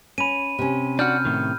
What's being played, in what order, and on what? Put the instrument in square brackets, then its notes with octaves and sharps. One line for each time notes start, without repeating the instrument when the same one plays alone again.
[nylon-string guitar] C#4 [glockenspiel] B5 D#7
[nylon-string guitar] C3 C#4
[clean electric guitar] D4 F#4 [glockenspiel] F6 G6
[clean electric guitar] A2 D#3